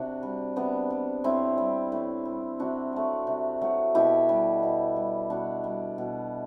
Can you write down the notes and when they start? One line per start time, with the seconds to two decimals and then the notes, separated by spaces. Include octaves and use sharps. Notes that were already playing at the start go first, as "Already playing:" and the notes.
Already playing: C3 D4 F#4
0.23 G3
0.56 C3 B3 D4
0.90 G3
1.24 A2 C4 E4
1.58 G3
1.92 A2
2.25 G3
2.59 C3 D4 F#4
2.93 F#3 A3
3.27 C3
3.61 F#3 A3
3.95 B2 E4 G4
4.29 G3
4.63 B2
4.96 G3
5.30 B2 D4 F#4
5.64 G3
5.98 B2